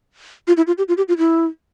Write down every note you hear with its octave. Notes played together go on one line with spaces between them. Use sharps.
F4
E4
F4
G4
F4
G4
F4
E4